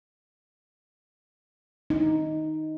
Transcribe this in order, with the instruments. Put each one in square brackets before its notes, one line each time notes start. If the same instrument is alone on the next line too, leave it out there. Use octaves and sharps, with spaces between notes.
[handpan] D#4